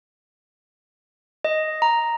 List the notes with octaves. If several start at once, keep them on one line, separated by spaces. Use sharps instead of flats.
D#5
A#5